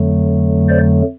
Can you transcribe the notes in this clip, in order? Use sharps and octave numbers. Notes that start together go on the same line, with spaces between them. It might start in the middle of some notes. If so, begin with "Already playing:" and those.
Already playing: F2 D3 F#3 A3
C5 D5